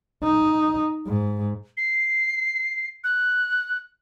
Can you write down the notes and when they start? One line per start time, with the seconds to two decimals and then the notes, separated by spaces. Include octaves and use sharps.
0.23 D#4
1.06 G#2
1.77 C7
3.04 F#6